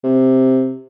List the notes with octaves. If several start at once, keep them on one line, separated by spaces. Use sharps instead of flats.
C3